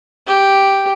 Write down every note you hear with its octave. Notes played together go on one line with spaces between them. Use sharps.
G4